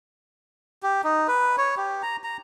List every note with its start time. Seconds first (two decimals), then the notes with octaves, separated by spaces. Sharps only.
0.83 G4
1.04 D#4
1.28 B4
1.58 C#5
1.77 G4
2.02 A#5
2.24 A#5